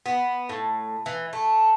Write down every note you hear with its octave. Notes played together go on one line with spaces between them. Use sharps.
B3
A2
E3
A3